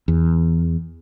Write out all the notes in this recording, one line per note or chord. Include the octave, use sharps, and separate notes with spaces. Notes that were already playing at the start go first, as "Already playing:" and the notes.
E2